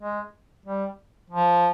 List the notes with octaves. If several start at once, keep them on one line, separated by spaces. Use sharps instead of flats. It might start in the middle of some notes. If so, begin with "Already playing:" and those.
G#3
G3
F3